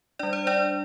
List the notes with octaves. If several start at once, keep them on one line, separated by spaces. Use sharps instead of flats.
G3 D4 D5
C5
D4 D5